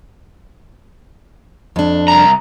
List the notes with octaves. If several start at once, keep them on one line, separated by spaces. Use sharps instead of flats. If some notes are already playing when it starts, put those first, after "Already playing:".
F2 D4
C2 A#5